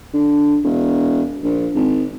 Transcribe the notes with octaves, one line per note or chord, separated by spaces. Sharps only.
D3
E1
A#1
G#1